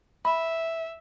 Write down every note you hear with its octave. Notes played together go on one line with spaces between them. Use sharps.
E5 B5